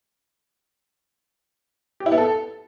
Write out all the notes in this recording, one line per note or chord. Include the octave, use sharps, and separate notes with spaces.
G4
E4
B3
A4